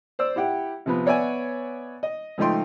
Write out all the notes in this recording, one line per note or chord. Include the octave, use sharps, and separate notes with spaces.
C5 D5 E6
E4 G4 F#5 G5
C3 F3 B3
B3 C#5 D5 E5 F#5 G#5
D#5
C#2 F3 A3 D#4 G5 C6